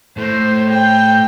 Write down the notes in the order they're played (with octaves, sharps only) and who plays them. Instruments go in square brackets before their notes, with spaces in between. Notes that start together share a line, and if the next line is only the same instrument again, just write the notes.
[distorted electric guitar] A2 [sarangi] C5
[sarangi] G5